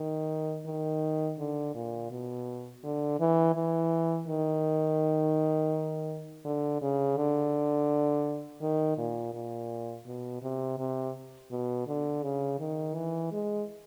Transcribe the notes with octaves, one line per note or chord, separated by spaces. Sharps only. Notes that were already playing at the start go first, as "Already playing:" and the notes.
Already playing: D#3
D#3
D3
A#2
B2
D3
E3
E3
D#3
D3
C#3
D3
D#3
A#2
A#2
B2
C3
C3
B2
D3
C#3
D#3
E3
G#3